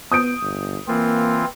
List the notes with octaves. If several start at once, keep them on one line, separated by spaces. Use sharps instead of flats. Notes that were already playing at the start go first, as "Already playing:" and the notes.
B3 D#6 G6 D7
G1
E3 A#3 C4 F4